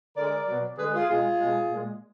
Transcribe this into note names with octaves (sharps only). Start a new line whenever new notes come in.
D3 G#3 A#4 D5
B2 F#3
D3 G#3 G#4 B4
F4 G#4
B2 G#3 F4 G#4
B2 G#3
A#2 G#3